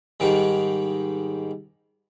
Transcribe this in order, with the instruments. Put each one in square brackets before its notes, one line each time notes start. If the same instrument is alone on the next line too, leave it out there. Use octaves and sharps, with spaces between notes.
[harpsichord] G#2 D#3 G3